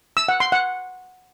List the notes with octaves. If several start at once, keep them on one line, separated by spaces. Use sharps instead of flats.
E6
F#5
C6
F#5